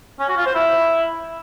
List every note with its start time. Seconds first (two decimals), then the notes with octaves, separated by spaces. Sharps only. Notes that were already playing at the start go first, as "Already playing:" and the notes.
0.20 C#4
0.28 F#4
0.37 F4
0.46 C5
0.55 E4